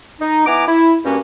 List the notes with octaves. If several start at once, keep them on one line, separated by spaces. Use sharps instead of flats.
D#4
B3 E4 G#5 A#5 D6
E4
G2 A#3 C#4 F#4 G4